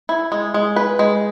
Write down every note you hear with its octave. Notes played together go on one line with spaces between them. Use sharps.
E4
G#3
G#3
B4
G#3